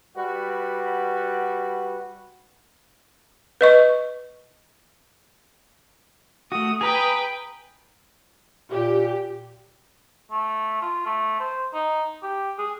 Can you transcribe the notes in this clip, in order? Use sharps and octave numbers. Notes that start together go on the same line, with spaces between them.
G3 F#4 B4
B4 D#5 C#6
A3 F#4 D#6
G#4 B4 G5 A#5 D#6
A#2 G4
A3
F4
A3
C5
D#4
G4
G#4